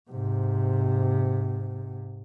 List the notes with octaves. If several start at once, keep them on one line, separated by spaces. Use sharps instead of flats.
G#2 C3